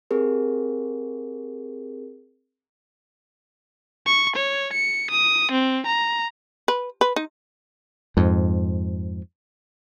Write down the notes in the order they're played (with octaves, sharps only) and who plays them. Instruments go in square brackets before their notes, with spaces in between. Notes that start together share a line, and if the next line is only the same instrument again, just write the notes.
[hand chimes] C4 G4 G#4 A#4
[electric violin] C#6
C#5
C#7
D#6
C4
A#5
[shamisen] B4
B4
D#4
[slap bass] F2 G#2